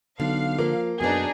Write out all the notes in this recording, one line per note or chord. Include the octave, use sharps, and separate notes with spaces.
B1 D3 F5
F3 A#3
F#2 B2 B3 D4 D#4 G#4